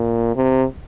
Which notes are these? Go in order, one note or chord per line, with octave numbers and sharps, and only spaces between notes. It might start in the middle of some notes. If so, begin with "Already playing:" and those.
Already playing: A#2
C3